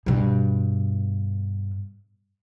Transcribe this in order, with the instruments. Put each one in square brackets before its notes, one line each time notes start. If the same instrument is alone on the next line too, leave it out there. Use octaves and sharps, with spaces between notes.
[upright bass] G2 B2